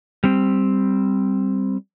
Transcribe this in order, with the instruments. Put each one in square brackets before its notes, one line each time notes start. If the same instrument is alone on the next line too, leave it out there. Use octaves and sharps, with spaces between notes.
[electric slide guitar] G3 C4